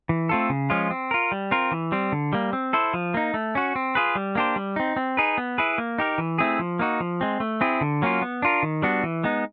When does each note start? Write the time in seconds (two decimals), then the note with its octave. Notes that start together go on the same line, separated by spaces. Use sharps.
0.09 E3
0.29 A3 C4 F4 A4
0.50 C#3
0.70 F3 G#3 C#4 F4
0.91 C4
1.11 F4 A#4
1.32 G3
1.51 C4 F4 A#4
1.72 E3
1.92 G3 C4
2.12 D3
2.33 G3 A#3
2.53 C4
2.73 E4 A4 C5
2.94 F3
3.14 A#3 D#4
3.34 A3
3.55 C#4 F#4
3.76 C4
3.95 F4 G#4 B4
4.15 G3
4.35 A#3 D4 G4 C5
4.56 G3
4.76 C4 D#4
4.96 C4
5.17 D#4 G#4 B4
5.38 B3
5.58 E4 G#4 B4
5.78 A#3
5.98 D#4 G4 A#4
6.18 E3
6.38 A3 C4 E4 G#4
6.59 F3
6.79 A#3 D#4 F#4
7.00 F3
7.21 G#3 C4
7.40 A3
7.61 C4 E4 G#4
7.81 D3
8.02 F#3 A#3 C#4 F4
8.22 B3
8.42 D4 F4 A#4
8.63 D#3
8.82 G3 B3 D4 F#4
9.04 E3
9.24 G#3 B3 D#4